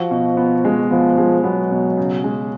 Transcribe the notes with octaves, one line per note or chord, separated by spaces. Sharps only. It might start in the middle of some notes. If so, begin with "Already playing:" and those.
Already playing: F3 F#4
B2
B3
G#3
F3 B3
G#3
F#3 B3
B2
C#3
G#3